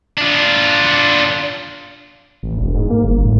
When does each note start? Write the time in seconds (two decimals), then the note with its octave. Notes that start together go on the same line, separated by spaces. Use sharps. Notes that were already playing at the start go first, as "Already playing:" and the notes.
0.18 D4 F4
2.43 A1
2.56 E1
2.74 G#2
2.90 A#3
3.04 G1
3.24 A2